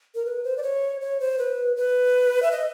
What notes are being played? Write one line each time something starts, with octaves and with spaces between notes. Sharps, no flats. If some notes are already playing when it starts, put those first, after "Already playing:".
A#4
B4
C5
D5
C#5
C#5
C5
B4
B4
E5
D#5